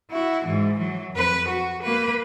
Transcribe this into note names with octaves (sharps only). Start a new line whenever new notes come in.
E4 F#4
G#2 E3
E3 F#3
F2 B4
F#4
A#3 B4